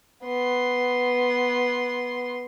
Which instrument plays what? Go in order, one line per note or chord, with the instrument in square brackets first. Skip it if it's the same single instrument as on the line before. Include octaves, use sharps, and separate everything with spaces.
[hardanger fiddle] B3 C6